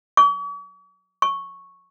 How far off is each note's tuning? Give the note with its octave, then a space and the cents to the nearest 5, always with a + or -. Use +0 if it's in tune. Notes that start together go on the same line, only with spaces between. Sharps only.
C#6 +45
C#6 -5